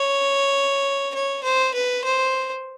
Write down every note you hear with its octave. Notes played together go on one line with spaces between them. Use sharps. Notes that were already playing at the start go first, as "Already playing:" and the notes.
Already playing: C#5
C#5
C5
B4
C5